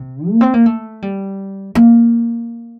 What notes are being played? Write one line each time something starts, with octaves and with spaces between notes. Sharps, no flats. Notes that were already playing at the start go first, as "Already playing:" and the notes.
Already playing: C3
A#3
C4
A#3
A3
G3
A#3